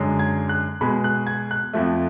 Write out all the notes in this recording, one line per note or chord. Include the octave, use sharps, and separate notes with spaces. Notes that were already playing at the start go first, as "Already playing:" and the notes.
Already playing: F#2 D3 G#3
G#6
F#6
B2 G#3 B5
F#6
G#6
F#6
F2 F3 A3